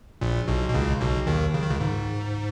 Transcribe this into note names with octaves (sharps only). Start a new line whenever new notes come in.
A#1 A#2
B1 B2
B2
C#2 C#3
B1 B2
D#2 D#3
C#3
D#3
C#2 C#3
G#2